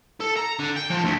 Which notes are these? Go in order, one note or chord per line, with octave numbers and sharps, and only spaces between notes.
A4
A#5
D3
G5
F3
D2